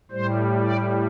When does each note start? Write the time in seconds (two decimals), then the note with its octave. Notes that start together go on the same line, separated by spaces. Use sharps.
0.11 A2 G3 C5
0.62 D5